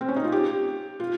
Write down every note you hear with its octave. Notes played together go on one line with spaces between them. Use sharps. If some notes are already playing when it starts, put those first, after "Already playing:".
C4
C#4
D#4
F4
G4
F4